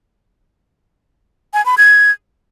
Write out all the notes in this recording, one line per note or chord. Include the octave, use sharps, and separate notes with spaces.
G#5
B5
G#6